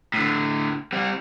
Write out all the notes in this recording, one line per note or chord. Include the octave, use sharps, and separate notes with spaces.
A2 D3
G3 C4